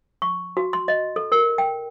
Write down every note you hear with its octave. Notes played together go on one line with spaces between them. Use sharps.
C#6
F#4
C6
D#5
A4
A#4
G5